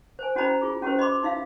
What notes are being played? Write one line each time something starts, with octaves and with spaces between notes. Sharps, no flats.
C5 G#5
C#4 F#4 C5 D#5 A#5 B5
F4 G#4
C#4 F#4 G4 B4 C5
D#5 B5 C6 D6
D#4 E5 F5